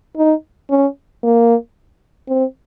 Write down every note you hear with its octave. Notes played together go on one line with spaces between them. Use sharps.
D#4
C#4
A#3
C4